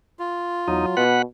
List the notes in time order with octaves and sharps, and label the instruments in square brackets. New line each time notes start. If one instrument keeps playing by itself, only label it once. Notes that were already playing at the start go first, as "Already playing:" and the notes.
[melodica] F4
[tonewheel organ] E2 D#4 [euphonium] F#3
[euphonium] B2 [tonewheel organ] B4 F#5